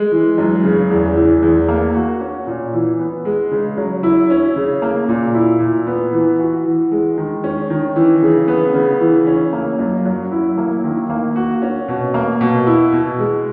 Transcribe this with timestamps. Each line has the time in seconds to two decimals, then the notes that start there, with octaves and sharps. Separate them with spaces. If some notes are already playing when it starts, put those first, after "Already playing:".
Already playing: G#3
0.12 E3
0.38 F#2
0.64 C#3
0.90 E2
1.16 E3
1.42 E2
1.68 A#3
1.95 F#4
2.21 C#4
2.47 A#2
2.73 E3
2.99 B3
3.25 G#3
3.51 C#3
3.78 F#3
4.03 E4
4.30 C#4
4.56 C#3
4.82 A#3
5.09 A#2
5.35 E4
5.60 A#2
5.87 B3
6.13 E3
6.39 F#4
6.65 E3
6.91 G#3
7.18 D#3
7.44 C#4
7.70 D#3
7.96 E3
8.22 C#3
8.48 B3
8.74 C#3
9.00 E3
9.27 C#4
9.53 A#3
9.79 F#2
10.05 F#3
10.32 E4
10.58 A#3
10.84 D#3
11.10 A#3
11.36 F#4
11.62 C#4
11.88 B2
12.14 A#3
12.41 B2
12.67 E4
12.92 B2
13.19 G#3